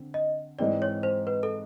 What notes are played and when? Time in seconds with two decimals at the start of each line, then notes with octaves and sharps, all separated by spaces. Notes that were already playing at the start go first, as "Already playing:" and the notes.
Already playing: D3 C4
0.14 D#5
0.59 G#2 E3 G#3 C4 D#4 D5
0.82 C#5
1.03 C5
1.27 B4
1.43 A4